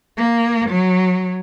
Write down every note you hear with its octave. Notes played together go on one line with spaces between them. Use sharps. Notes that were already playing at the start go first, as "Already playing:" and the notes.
A#3
F#3